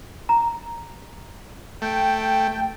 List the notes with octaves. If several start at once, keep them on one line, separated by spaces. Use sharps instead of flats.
A#5
A3 G5